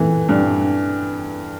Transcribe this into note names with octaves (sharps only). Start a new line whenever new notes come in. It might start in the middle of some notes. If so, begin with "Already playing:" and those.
Already playing: E3 A3
G2